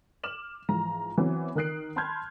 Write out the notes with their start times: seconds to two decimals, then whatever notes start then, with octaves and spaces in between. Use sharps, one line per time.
0.23 D6 F6 E7 F#7
0.69 G#2 E3 F3 A#5
1.18 E3 F#3 B3 C4
1.55 D#3 A#4 D#6 F#6 C7 D7
1.96 A5 B5 C6 F6 G6 G#6